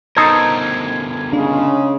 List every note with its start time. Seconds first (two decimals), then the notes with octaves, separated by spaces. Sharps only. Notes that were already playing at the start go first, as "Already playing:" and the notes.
0.16 D3 B3 D#4 A4 A#4 C5 G#6
1.33 C#3 G#3 D4